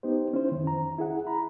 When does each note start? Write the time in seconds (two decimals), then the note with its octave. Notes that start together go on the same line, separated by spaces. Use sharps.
0.03 B3 D#4 G4 C5
0.34 C#4 E4 C5
0.52 F2 D#3
0.67 A#5
0.99 E4 G#4 F#5
1.27 A#5 B5